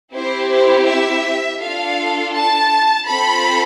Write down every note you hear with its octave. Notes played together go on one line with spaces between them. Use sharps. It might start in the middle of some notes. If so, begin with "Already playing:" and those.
C4 E4 G4 C5
C5
E5
D4 F4 A4 F5
A5
C4 F4 A4 B5